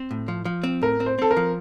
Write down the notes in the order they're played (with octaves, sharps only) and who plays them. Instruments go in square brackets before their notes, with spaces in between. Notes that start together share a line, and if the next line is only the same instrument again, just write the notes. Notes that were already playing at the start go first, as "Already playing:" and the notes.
Already playing: [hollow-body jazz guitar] C4
A2
F3
F3
C4
[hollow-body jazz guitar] A2 [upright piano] A#4
[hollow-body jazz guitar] C4
[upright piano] C5
[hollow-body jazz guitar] C4 [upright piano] A4
[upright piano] A#4
[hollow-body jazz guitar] F3